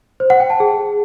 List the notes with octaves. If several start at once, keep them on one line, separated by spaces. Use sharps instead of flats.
C5
F#5
G5
A5
G#4